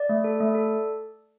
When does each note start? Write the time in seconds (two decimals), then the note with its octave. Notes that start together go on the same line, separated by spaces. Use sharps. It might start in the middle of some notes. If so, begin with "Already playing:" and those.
Already playing: D5
0.09 A3
0.24 A4
0.40 A3
0.55 A4